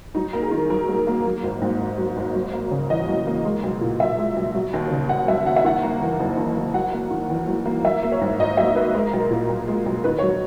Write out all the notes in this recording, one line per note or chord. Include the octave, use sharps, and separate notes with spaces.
F#3 D#4
A#3 A#4
G#4
D#3
F#2 A#4
F#3
A#3
F#3
G#1
G#2
G#1
F#3
G#1
F#3
A#3
C#3
E2 D#5
F#3
A#3
G#3
B1
A#2
B1 E5
G#3
B1
F#3
D#2
C#3
D#2 F#5
F#3 E5
D#2 F#5
E5
D#3 F#5
A#3
E2
F#1
D#3
A#3
F#3 F#5
A#3
D#3
E2
F#3
A#3
F#3 E5
A#3
C#5
G#2
G#1 D#5
F#3 E5
A#3 B4
G#3 A#4
B1
A#2
B1
G#3
B1
D#3 B4
C#5
F#3